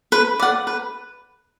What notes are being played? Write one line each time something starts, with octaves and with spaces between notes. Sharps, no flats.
B4
D5 F#5
B4